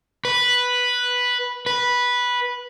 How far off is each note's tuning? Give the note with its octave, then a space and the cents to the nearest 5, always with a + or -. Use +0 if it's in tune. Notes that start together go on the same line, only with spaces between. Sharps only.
B4 -5
B4 -10